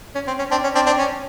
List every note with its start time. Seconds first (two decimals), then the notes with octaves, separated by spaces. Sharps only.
0.15 C#4
0.27 C4
0.39 C#4
0.51 C4 D4
0.64 C#4
0.75 C4 D4
0.86 C4 D4
0.98 C#4